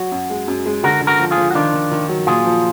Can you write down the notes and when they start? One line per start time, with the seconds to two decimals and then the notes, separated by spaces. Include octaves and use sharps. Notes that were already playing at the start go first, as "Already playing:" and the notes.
Already playing: F#3 F#4
0.12 F#2
0.30 G#3
0.48 F#2
0.66 G#3
0.83 D3 F#4 A#4
1.01 D3
1.07 F#4 A#4
1.19 F3
1.31 F4 G#4
1.37 F3
1.51 F#4
1.55 D#3 D4 F4
1.73 D#3
1.91 D#3
2.09 F#3
2.27 A#2 F4 G#4
2.45 F3